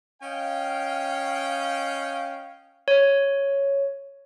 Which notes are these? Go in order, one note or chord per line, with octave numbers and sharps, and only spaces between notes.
C#4 D#5 F5 G5
C#5